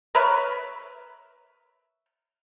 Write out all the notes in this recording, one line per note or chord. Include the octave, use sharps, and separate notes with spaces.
A#4 B4 C#5 E5